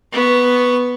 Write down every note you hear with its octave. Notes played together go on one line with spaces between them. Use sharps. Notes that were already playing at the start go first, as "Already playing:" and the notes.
B3 C#6